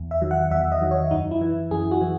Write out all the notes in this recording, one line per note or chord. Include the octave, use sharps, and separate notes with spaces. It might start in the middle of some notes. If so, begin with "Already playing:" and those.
Already playing: E2
E5
D#3 F#3
F#5
E2 E5
D#5
D#3 F#3
C#5
F#2 D#4
E4
E3
F#2 G#4
F#4
E3